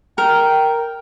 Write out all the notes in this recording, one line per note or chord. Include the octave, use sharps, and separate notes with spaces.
A#4 G5